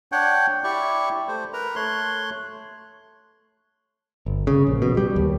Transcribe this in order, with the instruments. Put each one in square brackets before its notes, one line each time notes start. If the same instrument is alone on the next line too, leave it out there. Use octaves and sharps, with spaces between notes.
[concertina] D4 C#5 F#5 G5
E4 G4 D5 C#6
A3 C5
A#4 B4 A#5
A3 C#5 C6 F#6
[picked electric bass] G1
C#3
A#1
B2
G3
D#2